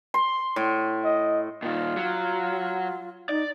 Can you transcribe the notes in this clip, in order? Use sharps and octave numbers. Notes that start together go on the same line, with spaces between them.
C6
A2
D#5
A#2 D#3 F4
F#3
D#4 D5